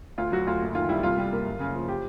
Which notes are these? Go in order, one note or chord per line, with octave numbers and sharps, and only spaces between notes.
D2 F4
F#3 F#4
D2 F4
F#1
D#3 F4
G3 E4
C2 F4
G3
A#3
F#1
C#3
F3
G4